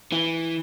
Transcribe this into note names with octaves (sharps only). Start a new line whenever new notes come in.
E3